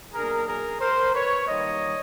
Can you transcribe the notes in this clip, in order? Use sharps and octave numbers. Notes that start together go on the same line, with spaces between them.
B2 F#3 A#3 D4 G#4 A#4
G#4 A#4
A#4 C5
B4 C#5
F#2 D#3 G3 A#3 C#5 D#5